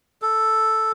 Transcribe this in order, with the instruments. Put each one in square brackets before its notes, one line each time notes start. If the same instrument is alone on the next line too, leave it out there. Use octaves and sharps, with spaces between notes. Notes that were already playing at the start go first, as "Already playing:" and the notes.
[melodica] A4